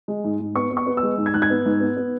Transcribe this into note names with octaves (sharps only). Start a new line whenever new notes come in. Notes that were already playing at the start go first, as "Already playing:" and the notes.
G#3
G#2
G#2
B3 C#6
B3
C#6
B3
E6
G#3
G#2
G#6
G#2 F#6
G#6
B3
G#2
B3
B3